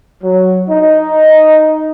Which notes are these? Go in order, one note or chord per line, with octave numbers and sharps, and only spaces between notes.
F#3
D#4